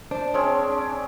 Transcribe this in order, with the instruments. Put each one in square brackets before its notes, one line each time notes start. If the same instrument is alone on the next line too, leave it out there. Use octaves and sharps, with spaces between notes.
[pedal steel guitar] D4 [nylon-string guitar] C5 D5
[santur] G#3 C4 C#4 [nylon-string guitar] C#5